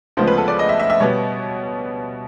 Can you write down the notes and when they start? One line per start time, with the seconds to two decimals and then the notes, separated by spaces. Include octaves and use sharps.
0.17 D2 C#3 F3 G#3 B3 C5
0.27 B4
0.38 A4
0.48 D5
0.59 D#5
0.69 E5
0.80 E5
0.90 E5
1.00 B2 G3 B3 C#5